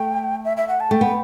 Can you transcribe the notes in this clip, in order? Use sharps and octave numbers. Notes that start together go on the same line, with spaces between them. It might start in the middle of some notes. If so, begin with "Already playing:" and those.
Already playing: A3 G5
E5
E5
F#5
A5
A3 G5
B3